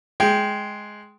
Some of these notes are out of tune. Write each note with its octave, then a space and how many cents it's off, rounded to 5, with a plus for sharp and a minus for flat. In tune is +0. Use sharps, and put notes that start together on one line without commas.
G#3 +10 G5 +0